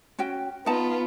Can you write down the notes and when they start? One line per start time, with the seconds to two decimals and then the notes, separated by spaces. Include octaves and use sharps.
0.19 C#4 F#4 G5
0.66 B3 D#4 F4 A5